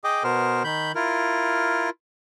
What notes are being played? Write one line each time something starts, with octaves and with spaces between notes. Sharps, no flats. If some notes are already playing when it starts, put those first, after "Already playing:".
G#4 D#5 G5 D6
B2 B3 A#4 C5
D#3 B5 G6
E4 F4 A#4